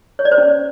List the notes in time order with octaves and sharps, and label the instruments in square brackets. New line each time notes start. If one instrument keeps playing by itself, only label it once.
[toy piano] C#5
D5
C5
C#4